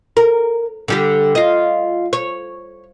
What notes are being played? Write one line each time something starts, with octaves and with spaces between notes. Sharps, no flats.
A#4
D3 G3 G4
F4 D#5
C#5